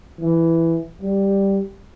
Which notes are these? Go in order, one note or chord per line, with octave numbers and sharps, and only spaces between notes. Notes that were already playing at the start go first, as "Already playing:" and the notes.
E3
G3